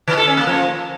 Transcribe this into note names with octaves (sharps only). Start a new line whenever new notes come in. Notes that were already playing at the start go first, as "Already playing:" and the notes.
D#3
A4
C#4
A#3
F3